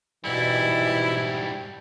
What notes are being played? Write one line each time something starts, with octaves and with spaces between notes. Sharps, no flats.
G#2 B2 E3 G3 E4